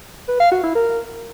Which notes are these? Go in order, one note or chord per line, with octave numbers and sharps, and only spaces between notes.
B4
F5
F#4
E4
A#4